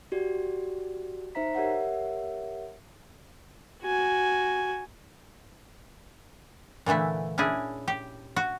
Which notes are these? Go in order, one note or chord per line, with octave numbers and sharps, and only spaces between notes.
F#4 G4 D5
D#4 C5 E5 A#5 B6
G4 A#4 C#5 E5 F#5
F#4 G#5
A#2 D3 E3 A3 E4
C#4 D4 E4 G#4
G4
F#4